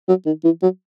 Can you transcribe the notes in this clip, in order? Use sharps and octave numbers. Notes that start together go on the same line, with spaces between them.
F#3
D#3
E3
F#3